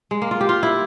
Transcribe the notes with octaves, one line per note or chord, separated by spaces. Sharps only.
G#3
A#3
F4
G4
F4
E4